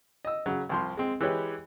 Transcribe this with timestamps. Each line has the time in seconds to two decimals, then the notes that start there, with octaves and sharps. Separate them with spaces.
0.25 D#5 E6
0.46 C#3 F#3
0.69 C2 F3 C6
0.97 G#3 C4
1.21 E3 G#3 G4 B4 C#5